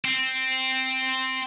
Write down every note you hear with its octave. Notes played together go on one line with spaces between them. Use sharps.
C4